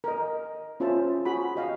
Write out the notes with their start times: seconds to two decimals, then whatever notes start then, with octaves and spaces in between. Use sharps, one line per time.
0.04 A#4 D#5
0.80 C#4 F4 G#4 C5 E5 A5
1.25 F#4 G#4 F#5 B5
1.56 G4 D#5 F5